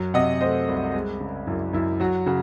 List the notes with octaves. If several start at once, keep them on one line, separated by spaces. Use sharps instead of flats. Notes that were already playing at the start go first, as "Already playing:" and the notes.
Already playing: F#2 F#3
C3 D#5 F#5
A3 C5 D#5
C2
G#3
C#3
F#2 E4
F#2 E4
F#3 F#4
C#3 F#4